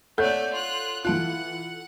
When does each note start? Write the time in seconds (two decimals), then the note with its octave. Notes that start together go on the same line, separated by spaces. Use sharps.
0.18 A3 A4 C#5 D5 F#5 G6
0.53 F4 F#6
1.05 E3 F4 F#5 A5 F#6